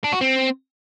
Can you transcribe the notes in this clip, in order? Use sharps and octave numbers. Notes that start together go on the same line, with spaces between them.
D4
F#4
C4